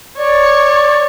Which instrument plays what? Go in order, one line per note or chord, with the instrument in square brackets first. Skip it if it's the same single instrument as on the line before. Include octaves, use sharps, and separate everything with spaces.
[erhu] C#5 [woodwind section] D5